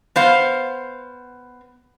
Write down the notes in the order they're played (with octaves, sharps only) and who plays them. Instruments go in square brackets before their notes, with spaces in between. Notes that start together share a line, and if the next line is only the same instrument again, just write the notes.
[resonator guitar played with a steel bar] B3 C5 F5